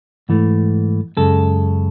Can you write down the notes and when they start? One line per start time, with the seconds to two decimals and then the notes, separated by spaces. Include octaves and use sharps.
0.29 G#2 E3 A3
1.17 F#2 C#3 G#3 A4